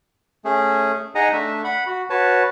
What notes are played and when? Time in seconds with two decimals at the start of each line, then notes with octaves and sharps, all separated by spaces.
0.45 A3 C#4 G#4
1.15 D#4 G#4 D#5 F#5 G#5 A#5
1.33 A3 D4 E5
1.64 F#5 B5
1.86 F#4
2.10 F#4 B4 C#5 A5